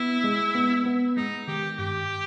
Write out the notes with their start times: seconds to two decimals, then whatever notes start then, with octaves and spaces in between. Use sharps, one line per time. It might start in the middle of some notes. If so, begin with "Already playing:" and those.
Already playing: B3 E4
0.24 G#3
0.55 B3
0.86 B3
1.17 G#3 D#4
1.48 D#3 G4
1.78 G2 G4